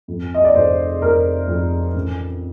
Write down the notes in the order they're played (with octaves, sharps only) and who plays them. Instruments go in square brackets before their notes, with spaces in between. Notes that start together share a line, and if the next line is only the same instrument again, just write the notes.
[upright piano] F2
D#5
D5
F1 C5
F1 A#4
F2
A1